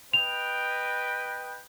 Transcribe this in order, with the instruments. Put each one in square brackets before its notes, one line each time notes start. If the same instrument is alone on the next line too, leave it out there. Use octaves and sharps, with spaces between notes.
[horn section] B4 D#5 G5 [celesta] F7